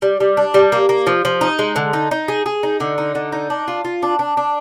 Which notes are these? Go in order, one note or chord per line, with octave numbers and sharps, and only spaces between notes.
G3
G3
D4
G3
A#3
A#3
F3
F3
D#4
G#3
D3
D#4
D#4
G#4
G#4
D#4
D3
D#4
D3
D#4
D4
F4
F4
D4
D4
D4